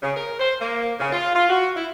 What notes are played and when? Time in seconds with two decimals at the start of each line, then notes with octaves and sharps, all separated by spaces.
0.02 C#3
0.16 A#4
0.40 C5
0.60 A#3
1.00 C#3
1.12 F4
1.34 F4
1.49 F#4
1.76 E4